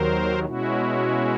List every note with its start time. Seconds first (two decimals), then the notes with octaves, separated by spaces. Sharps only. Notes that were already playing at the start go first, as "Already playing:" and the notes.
Already playing: D#2 D#3 F#3 A#4 C5
0.45 B2 G#3 C#4 E4 F#4